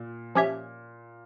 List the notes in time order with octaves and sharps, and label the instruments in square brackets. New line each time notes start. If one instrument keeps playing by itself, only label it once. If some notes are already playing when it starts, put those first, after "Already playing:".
Already playing: [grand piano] A#2
[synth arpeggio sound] F3 C#4 G4 C#5 E5